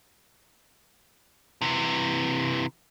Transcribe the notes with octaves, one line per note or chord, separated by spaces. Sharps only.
C3 E3